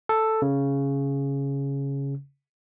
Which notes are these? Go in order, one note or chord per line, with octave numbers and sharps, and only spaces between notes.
A4
C#3